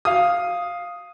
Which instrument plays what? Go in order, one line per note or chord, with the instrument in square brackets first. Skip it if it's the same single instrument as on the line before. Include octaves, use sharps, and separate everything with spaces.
[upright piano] F5 D#6